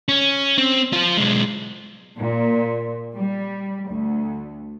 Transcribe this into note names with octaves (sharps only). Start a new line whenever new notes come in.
C#4
C4
F4 C5
B1 G#3
A#2
G3
D2